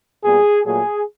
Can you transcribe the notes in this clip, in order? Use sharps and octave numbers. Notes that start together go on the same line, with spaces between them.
A#2 G3 B3 G#4
A#2 F#3 A3 G#4